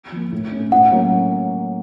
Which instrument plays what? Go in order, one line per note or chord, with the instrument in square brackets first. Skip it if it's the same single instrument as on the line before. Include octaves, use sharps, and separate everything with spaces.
[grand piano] F3 A#3
A2
A3 C#4
[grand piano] A2 [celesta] F#5
[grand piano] F#3 A#3 C#4